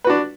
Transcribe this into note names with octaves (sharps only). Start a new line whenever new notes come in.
D4 F#4 B4